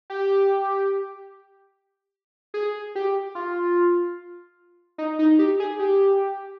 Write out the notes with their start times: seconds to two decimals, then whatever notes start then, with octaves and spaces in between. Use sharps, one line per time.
0.10 G4
2.54 G#4
2.95 G4
3.35 F4
4.98 D#4
5.19 D#4
5.39 G4
5.60 G#4
5.79 G4